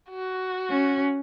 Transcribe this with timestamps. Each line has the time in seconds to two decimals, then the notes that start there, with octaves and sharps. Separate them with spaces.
0.10 F#4
0.70 C#4